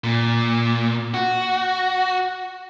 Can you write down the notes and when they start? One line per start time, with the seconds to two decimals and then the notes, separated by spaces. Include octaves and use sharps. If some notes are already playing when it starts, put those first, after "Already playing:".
0.04 A#2
1.14 F#4